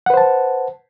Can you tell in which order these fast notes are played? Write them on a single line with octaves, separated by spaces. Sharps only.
F#5 B4 C5 A5